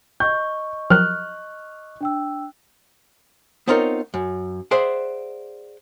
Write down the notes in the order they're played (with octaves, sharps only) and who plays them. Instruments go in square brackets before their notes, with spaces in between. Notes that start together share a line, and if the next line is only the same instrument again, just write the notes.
[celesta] D#5 C#6 [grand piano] G6
[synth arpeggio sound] F3 F#3 A#4 [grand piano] F6 F#6
[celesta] D4 G5 E6
[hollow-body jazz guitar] B3 C4 D#4 F4 A#4 C#5
F#2
G#4 C5 D5 E5 F#5